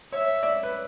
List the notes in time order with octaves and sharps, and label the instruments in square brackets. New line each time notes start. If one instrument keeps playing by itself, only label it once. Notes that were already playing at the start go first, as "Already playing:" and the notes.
[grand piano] C#5 [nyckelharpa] E5
[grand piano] D5
B4